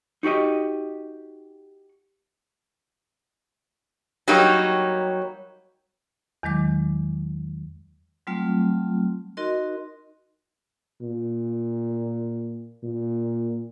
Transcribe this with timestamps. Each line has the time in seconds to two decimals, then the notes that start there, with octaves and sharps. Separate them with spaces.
0.23 D#4 F#4 G4 D#5
4.28 F#3 G3 A#3 D#4 G4 C#5
6.43 E2 D#3 F#3 G#3 D6
8.27 F#3 G3 A3 C4 F4
9.37 D#4 F#4 A#4 D#5 C6
11.02 A#2
12.84 A#2